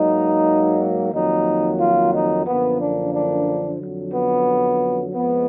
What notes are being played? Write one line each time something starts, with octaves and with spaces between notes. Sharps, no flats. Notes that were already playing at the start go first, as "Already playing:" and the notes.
Already playing: G#2 F#3 A#3 D#4
F2 D#3 F#3 A#3 D#4
F4
D#4
F#2 D3 F3 A#3 B3
D4
D4
F2 D3 F#3
B3
F2 F3 G#3 B3